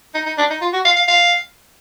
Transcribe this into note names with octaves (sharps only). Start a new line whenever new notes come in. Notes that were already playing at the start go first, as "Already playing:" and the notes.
D#4
D#4
D4
D#4
F4
F#4
F5
F5
F5